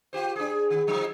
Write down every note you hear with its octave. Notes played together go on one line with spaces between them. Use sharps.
F4 G4 C5
D4 G#4
D#3
F3 F#3 D#4